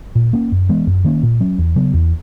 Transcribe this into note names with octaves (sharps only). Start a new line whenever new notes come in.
A#2
A#3 C#4
F#2
E3 G#3 B3
F#2
D#3 A#3 C#4
A#2
F#3 C#4
E2
C#3 F#3 B3
E2